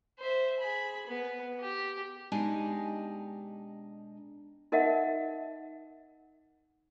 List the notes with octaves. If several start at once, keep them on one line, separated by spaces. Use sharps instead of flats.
C5 E5
G#4 B5
B3
G4
B2 G#3 D4 D#4 G4 D#5
D#4 A#4 D#5 E5 F#5